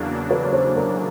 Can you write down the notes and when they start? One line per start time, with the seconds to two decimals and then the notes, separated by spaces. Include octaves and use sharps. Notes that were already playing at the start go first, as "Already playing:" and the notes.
Already playing: E2 C#3 F#3 A#3 D4
0.31 B4
0.44 C#5
0.53 C5
0.76 A#4